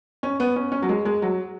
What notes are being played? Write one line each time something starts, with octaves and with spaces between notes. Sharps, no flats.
C#4
B3
C#4
C#4
F#3
G#3
G#3
F#3